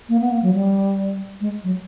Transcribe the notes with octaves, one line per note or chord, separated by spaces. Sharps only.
A#3
B3
A#3
F#3
G3
G#3
F#3